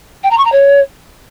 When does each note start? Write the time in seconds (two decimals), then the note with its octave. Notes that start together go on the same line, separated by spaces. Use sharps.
0.23 G5
0.30 A#5
0.37 C#6
0.45 A#5
0.52 C#5